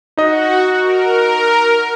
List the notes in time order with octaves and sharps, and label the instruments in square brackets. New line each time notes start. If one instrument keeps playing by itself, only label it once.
[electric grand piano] D#4 D#5 [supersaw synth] F#4
[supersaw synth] A#4